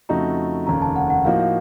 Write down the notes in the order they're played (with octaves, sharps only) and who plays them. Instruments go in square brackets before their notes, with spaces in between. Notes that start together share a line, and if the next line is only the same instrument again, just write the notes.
[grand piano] F2 C#3 A3 D#4 F#4 [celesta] A#5
[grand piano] F1 D#2 C#3 [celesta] A#5
[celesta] A5
F#5
F#5
[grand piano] A2 F3 A#3 D#4 F#4 [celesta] F5
[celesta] F5